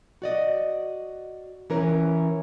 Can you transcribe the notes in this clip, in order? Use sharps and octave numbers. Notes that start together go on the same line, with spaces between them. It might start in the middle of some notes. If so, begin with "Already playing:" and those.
F#4 D5 D#5
E3 C#4 A#4 B4 C#5